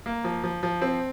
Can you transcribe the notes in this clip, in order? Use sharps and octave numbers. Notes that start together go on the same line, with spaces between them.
A#3
F3
F3
F3
C4